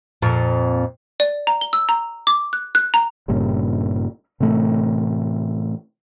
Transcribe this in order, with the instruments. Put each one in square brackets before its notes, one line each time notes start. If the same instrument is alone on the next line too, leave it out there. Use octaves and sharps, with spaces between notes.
[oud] F2 A#2
[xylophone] D5
A#5
G7
E6
A#5
D6
F#6
F#6
A#5
[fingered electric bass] G1 G2 A#2 C#3
A2 C3 E3 A3